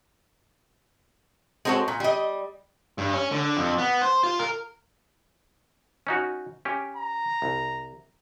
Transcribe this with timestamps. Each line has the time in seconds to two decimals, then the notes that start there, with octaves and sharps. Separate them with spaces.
1.65 G#3 C4 F#4 A4 C#5
1.88 A#2
2.00 G3 D#5
2.98 G2
3.13 C#4
3.32 D3
3.57 F2
3.78 B3
4.02 C5
4.23 F4
4.39 A#4
6.07 C#4 D#4 F#4
6.65 C#4 G4
6.97 A#5
7.42 C2